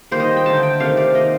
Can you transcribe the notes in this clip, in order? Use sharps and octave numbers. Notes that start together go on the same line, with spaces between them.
D#3 G3 A#3 C5
D#5
G5
D3 A3 A5
G5
C3 D#3 A3 F5
D5
D#3 A#3 D#5